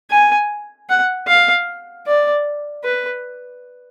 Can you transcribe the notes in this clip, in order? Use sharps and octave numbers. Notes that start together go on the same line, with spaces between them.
G#5
F#5
F5
D5
B4